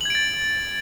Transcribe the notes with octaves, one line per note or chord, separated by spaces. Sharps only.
G#6 A6 D7 F#7